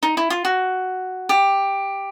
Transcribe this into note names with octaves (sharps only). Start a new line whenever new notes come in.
D#4
E4
F4
F#4
G4